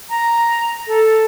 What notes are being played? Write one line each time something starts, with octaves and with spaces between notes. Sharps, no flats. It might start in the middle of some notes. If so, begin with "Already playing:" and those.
A#5
A4